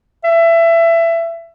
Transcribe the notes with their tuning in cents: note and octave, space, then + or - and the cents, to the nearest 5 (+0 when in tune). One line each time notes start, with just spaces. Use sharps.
E5 +20